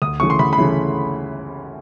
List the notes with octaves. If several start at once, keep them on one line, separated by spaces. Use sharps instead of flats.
D2 D#6
C#3 E3 A3 C#6
C6
D2 B5
B5
C#3 E3 A3